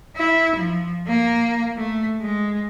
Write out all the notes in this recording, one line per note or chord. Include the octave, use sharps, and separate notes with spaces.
E4
F3
A#3
A3
G#3